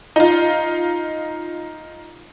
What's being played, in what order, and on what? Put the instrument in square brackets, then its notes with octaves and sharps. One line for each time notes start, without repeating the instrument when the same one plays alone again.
[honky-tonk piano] D#4 F4